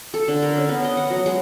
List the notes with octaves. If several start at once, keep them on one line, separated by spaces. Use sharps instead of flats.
A4
D3
A#4
C#4
B3
D#5
F#5
F#3
G#3